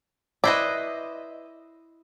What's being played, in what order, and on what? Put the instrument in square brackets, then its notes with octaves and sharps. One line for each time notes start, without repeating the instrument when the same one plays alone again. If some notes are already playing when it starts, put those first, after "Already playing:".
[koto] E4 C5 D#5 [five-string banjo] B4 D5